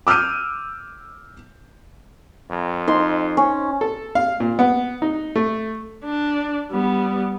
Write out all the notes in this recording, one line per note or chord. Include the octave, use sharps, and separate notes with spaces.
D6 E6 F6 G6 D#7
F2
D#4 C6
C#4
A4
F5
A#2
B3
D#4
A3
D4
G3 B3